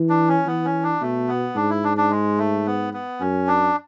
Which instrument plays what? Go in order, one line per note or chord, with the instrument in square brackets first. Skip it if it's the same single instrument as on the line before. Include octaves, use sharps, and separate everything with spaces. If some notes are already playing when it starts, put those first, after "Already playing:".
Already playing: [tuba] E3
[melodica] D4
C#4
[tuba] E3 [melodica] B3
[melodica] C#4
D4
[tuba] B2 [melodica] A3
[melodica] B3
[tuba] G#2 [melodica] D4
[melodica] E4
D4
D4
G#3
A3
B3
B3
[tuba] F#2 [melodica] C#4
[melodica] D4